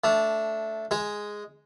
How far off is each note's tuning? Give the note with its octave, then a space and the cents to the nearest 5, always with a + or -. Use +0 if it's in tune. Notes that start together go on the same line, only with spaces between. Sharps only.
A3 +0 D4 -15
G#3 +0 G#4 +0